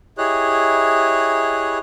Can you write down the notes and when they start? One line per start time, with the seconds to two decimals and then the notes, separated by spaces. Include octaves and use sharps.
0.18 E4 G4 G#4 C#5 D#5 F#6